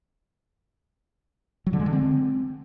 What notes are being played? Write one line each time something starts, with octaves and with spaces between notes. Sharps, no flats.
F#3
D3
G#3
D3
C4